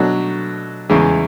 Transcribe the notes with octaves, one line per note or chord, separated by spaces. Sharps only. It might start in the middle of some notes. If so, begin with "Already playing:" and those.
Already playing: B2 F#3 A3 D4
E2 C#3 E3 G#3